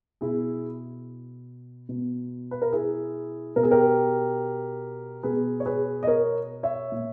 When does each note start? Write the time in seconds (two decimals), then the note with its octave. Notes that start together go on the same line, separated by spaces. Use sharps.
0.21 B2 E4 G#4
1.89 B2
2.51 B4
2.62 A#4
2.72 E4 G#4
3.56 B2 A#4
3.63 G#4
3.71 G4 A#4
5.23 B2 G#4 B4
5.60 C#5
5.66 G#4 B4
6.03 D#5
6.07 A#4 C#5
6.63 C#5 E5
6.92 A#2